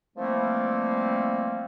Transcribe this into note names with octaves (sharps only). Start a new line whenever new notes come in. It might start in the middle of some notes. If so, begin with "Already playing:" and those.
E3 F3 G3 A3 A#3 C4